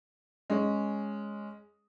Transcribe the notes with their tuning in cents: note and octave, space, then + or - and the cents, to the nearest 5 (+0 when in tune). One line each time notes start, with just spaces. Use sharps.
G#3 +0 C#4 +0